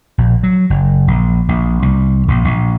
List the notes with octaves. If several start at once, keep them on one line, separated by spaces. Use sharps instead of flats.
A#1
F#3
F#1
A#1
A#1
C2
A#1
A#1